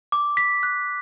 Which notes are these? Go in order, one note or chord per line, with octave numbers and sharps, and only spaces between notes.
D6
B6
F#6